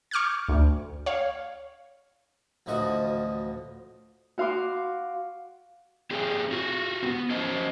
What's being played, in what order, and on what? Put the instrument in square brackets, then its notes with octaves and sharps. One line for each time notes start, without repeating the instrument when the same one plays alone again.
[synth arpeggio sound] C#6 D6 F6 G6 G#6
D2
C#5 F5
[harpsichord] A1 D2 F3 F#4 D#5
[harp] F#4 F5 C6 D6
[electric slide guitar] C4 G4 G#4
F4 F#4
B3 C4
C#4 C5 D#5